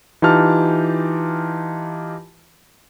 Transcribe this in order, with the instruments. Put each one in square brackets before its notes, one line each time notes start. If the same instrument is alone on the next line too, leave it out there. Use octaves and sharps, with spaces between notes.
[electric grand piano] E3 D#4 F4 G4 A5 F6